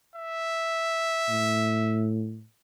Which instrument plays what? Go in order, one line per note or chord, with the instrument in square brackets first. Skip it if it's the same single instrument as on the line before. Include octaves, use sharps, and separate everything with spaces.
[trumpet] E5
[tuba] A2